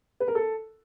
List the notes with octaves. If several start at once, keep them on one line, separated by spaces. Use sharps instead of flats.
B4
A#4
A4